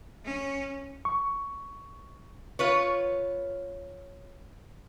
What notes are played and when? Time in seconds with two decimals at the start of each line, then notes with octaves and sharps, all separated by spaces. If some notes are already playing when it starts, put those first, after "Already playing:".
0.25 C#4
1.05 C#6
2.59 F4 B4 C#5